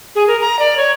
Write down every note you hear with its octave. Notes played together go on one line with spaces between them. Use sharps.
G#4
A#4
A#5
D5
C#5